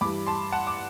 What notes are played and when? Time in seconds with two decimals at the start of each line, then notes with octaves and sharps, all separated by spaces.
0.01 G2 E3 G3 B5 D6
0.27 A5 C6
0.52 F#5 A5
0.67 D6